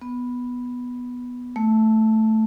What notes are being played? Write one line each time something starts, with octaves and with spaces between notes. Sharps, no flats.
B3
A3